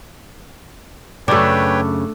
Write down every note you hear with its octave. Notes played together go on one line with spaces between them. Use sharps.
F#2 C#3 A3 D4 B4 C#5 G5